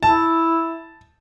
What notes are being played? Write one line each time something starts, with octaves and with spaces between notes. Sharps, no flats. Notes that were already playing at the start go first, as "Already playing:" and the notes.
E4 A5